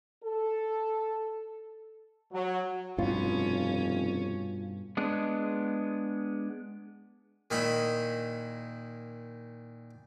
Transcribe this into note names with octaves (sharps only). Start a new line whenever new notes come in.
A4
F#3
F1 G2 B2 C#4 F4
G#3 B3 D4
A#2 D#3 D#4 E4 B5